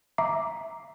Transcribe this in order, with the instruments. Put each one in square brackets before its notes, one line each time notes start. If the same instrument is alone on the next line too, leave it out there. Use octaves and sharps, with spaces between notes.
[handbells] E5 A#5 D6 C7